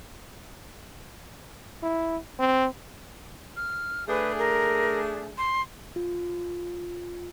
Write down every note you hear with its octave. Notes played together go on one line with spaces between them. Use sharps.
E4
C4
F6
A3 D4 G#4 B4
A#4
C6
F4